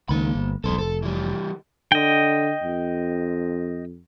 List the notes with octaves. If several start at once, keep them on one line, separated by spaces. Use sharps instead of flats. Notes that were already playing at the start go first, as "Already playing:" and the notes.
C#2 D#3 A#3 B5
G1
E1 B1 A4 C5
F1 A4
E3 G3
D3 D#5 G5
F2